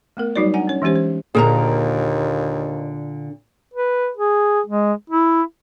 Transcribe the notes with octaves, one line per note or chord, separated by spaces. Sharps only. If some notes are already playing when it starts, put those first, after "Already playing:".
A3 B3 A#4
F#3 G3 D#4 F#4 C#5 D5
D4 F#5 G#5 A#5
C#4 C#5
E3 G#3 C#4 G4 C5
C5
D#2 A#2 D3 A#3 G#4 A#4 A#5
B4
G#4
G#3
E4